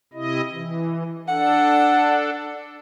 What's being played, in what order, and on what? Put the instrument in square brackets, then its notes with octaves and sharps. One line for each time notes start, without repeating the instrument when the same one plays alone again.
[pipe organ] C3 E4 D#5
E3
[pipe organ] D4 A4 [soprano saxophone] F#5